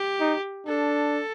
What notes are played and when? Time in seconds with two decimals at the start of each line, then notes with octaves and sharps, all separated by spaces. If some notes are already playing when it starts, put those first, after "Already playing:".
Already playing: G4
0.20 D#4
0.67 D4 A4